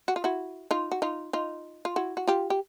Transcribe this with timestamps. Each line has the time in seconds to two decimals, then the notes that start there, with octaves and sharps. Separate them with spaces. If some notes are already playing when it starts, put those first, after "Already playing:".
0.08 F#4
0.16 F4
0.24 E4 F#4
0.71 D#4 F4
0.91 F#4
1.02 D#4 F4
1.33 D#4 F4
1.85 F4
1.96 E4 F#4
2.17 F#4
2.27 F4 G4
2.50 G4